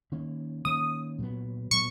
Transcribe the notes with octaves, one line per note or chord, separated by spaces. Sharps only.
D#3 A#3 C#4
D#3 A#3 C#4 D#6
A#2 F#3 B3
A#2 F#3 B3 C#6